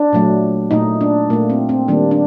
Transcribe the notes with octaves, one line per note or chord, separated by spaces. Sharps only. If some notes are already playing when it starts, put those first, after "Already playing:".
Already playing: D4
A#2 F#3 A3
A#2 A3 D#4
D4
A#2 A3 A#3
C4
C4
D#3 G3 A#3 D4
D4